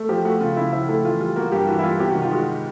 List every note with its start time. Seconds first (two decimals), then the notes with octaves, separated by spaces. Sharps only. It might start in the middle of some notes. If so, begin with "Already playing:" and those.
Already playing: A3
0.09 F3 G4
0.25 A3 F#4
0.40 C#3 F4
0.56 C#3 E4
0.72 F3 E4
0.89 A3 E4
1.04 E3 F4
1.20 G3 F4
1.36 A#3 F#4
1.52 G2 G4
1.67 E3 F#4
1.79 E4
1.84 G3 F4
1.99 C3 G4
2.11 D#3 F#4
2.22 F4
2.31 G#3 F#4